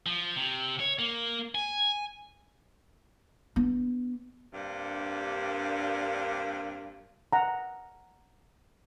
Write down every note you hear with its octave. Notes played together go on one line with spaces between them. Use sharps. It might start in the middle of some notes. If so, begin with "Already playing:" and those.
F3
C3
C#5
A#3
G#5
B3 D4
G2 C3 G3 A#3 D4
F#5 A#5